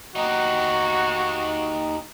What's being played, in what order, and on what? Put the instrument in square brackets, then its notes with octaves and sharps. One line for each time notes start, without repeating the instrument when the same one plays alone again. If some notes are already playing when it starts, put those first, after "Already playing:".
[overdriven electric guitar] D#4 G4 [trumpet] F#4